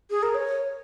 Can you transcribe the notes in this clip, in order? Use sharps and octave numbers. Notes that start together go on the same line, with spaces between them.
G#4
A#4
C#5